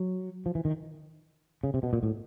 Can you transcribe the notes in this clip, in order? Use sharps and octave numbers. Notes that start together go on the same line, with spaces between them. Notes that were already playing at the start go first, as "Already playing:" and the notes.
Already playing: F#3
F3
E3
D#3
C#3
C3
B2
A#2
A2